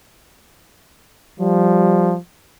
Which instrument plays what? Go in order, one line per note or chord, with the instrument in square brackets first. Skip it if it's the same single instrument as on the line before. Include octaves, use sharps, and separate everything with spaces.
[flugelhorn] F3 [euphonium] G3